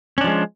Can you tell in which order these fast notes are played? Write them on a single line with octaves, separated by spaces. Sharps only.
C#4 D4 F3 G#3